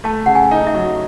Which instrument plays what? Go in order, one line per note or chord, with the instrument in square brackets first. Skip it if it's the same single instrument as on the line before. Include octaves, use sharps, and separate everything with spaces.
[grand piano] A3 [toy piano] A5
[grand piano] C#3 [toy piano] F#5
[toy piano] G#5
[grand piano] D#4
[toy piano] E5
[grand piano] F#3